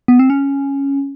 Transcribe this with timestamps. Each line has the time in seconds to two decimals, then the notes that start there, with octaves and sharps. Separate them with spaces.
0.08 B3
0.19 C4
0.30 C#4